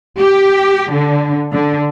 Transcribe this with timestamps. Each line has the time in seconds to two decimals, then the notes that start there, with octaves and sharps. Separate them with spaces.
0.18 G4
0.91 D3
1.53 D3